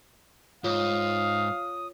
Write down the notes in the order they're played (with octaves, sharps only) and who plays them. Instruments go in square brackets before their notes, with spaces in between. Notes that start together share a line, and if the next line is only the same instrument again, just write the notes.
[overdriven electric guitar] G#2 [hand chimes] F4 C#5 [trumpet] F5 [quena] D#6